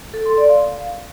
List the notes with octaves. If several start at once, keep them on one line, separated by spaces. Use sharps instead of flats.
A4
C6
D5
F5